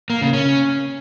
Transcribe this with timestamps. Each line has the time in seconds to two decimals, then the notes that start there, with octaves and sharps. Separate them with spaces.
0.10 A#3
0.22 C#3
0.33 C#4